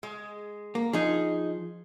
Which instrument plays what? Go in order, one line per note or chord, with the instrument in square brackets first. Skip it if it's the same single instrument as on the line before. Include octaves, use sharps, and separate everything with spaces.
[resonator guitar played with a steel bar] G#3
[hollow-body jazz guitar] A#3
[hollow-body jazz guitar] F3 [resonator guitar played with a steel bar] D#4 G#4